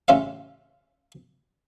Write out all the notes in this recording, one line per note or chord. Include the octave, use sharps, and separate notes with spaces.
A1 C#3 C#4 F4 E5 F5